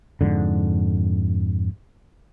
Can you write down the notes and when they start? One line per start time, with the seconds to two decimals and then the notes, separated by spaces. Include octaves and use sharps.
0.21 F2 G#2 D3